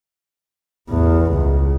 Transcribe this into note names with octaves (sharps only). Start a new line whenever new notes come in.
A1 E2
C#2